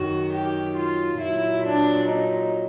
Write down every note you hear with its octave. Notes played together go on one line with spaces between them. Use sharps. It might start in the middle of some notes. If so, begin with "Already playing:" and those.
Already playing: F#2 D#3 F#3 F#4
G4
F4
A#2 F#3 E4
D4
D#4